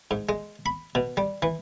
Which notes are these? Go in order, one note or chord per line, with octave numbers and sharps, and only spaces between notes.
G#2
G#3
B5
B2
G3
E3